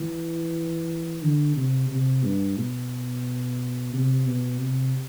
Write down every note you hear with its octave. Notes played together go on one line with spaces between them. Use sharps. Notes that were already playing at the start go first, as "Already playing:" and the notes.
Already playing: E3
D3
C3
C3
G2
B2
C3
B2
C3